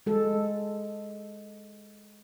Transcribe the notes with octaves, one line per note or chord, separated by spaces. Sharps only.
G#3 A4